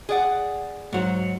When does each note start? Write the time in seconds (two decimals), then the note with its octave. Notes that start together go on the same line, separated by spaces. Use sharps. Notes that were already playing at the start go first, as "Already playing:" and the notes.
0.09 G#4 D5 F#5
0.93 G#2 F#3